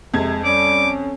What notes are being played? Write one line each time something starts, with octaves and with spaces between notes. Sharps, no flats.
F2 C3 G#3 G#6
G3 C#4 D6